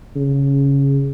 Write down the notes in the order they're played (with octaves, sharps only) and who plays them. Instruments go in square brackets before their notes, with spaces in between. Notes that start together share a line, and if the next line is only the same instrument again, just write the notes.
[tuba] C#3